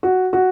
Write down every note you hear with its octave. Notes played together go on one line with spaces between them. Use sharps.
F#4
F#4